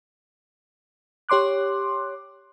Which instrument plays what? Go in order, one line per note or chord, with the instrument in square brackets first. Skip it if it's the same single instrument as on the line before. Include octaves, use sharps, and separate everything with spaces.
[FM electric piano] G4 C#5 C6 D6 F#6